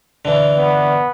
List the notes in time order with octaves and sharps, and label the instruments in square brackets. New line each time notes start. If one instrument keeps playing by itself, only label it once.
[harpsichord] D3 E3
[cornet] B3